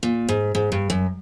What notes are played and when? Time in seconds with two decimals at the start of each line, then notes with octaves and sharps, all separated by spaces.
0.03 A#2
0.29 G#2
0.55 G#2
0.72 G2
0.90 F#2